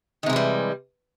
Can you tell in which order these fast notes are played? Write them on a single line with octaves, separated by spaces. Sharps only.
D#3 C3 G#3 E3 G3